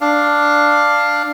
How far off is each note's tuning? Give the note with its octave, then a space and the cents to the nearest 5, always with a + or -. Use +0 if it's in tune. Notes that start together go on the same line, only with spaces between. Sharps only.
D4 +0 F5 +0